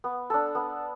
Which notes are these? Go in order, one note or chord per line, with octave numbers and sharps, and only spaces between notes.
B3
D4 A4
B3